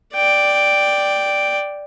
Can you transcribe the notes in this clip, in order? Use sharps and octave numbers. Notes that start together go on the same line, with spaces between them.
D5 G5